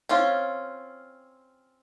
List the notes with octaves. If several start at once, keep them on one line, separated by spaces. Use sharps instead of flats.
C4 C#4 F4